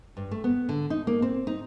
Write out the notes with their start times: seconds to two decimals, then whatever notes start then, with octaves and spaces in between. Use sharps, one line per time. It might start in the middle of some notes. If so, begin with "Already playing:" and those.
0.17 G2
0.31 A3
0.44 B3
0.69 D3
0.90 D#4
1.07 A#3
1.22 C4
1.47 D#4